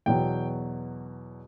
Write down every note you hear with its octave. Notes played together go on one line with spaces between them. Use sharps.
E2 B2 F#3 G5